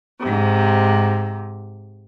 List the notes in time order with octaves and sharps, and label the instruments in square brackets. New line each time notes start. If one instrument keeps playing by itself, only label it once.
[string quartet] G#2 C3